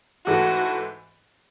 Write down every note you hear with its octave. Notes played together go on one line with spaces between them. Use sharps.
G#2 E3 A3 F#4